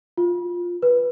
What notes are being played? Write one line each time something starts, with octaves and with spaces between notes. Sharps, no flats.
F4
B4